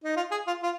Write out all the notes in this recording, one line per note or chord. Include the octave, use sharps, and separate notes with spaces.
D#4
F4
G#4
F4
F4